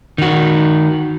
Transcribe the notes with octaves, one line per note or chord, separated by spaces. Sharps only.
D#3 F#4